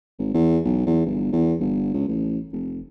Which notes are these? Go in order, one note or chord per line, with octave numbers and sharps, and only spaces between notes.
G#1
E2
B1
E2
G1
E2
G1
C#2
A1
F1